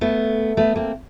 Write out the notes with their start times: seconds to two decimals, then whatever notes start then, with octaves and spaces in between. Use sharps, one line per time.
0.01 A3 B3
0.57 A3 B3
0.76 A#3 C4